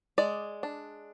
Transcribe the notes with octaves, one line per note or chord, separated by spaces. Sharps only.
G#3 D5
D4